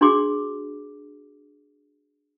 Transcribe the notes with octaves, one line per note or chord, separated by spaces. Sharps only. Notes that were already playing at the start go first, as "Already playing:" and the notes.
D4 F#4 G#4 C6 D6